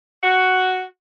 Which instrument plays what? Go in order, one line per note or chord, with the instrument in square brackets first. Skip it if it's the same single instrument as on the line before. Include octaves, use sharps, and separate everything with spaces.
[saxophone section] F#4